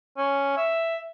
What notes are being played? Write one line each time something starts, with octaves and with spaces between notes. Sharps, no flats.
C#4
E5